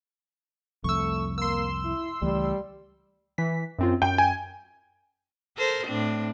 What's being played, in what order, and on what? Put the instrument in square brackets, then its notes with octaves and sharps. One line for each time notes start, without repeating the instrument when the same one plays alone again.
[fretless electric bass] C2 F2 [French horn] A3 [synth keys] C#6 E6
[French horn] A#3 [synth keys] C6 E6
[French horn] E4
[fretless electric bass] C#2 E3 A3 [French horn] G3
[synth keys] E3 B6
F#2 C4 F4
[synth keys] F#2 [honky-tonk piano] G5
[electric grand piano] G#5
[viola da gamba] A4 A#4 C5
A2 C4 D4